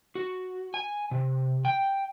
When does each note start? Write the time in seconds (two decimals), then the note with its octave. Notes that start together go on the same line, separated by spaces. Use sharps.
0.15 F#4
0.74 G#5
1.11 C3
1.65 G5